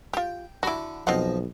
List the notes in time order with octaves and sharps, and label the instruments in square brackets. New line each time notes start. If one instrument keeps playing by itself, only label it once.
[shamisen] F4 G4 [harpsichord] G5
[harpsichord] D3 B5 D6 [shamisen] E4 F#4
[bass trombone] B1 [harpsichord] F3 D#5 [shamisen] C4 F4 F#5